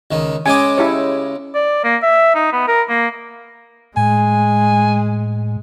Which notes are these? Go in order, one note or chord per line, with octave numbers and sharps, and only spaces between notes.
C#2 D#3
C#3 G#3 G#5 D6
E4 G4 C#5
D5
A#3
E5
D#4
B3
A#4
A#3
A2 G#3 G#5